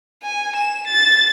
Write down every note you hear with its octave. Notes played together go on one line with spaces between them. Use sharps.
G#5
E7
A6